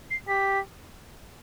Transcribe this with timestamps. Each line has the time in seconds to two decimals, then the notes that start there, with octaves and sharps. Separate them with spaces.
0.11 C7
0.28 G4 B6